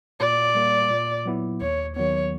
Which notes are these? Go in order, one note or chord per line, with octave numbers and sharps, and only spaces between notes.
A#2 D5
G3 A#3
A#2
F#3 B3 E4
D#2 C#5
D#3 F#3 B3 C#5